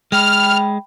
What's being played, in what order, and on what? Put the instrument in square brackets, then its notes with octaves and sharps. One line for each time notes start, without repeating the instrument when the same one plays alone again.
[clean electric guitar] G#3 [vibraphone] G5 B5 [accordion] F6